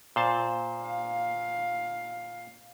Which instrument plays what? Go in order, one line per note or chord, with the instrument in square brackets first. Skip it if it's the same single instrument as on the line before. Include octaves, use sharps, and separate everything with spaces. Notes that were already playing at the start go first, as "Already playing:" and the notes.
[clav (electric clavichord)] A#2 C5 A5
[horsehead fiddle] F5